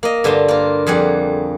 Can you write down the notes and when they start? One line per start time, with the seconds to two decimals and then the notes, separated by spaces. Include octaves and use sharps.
0.03 A#3 D#5
0.24 G2 D3 A5 C6
0.48 A#3 F4
0.87 F2 G3 G#4 F#5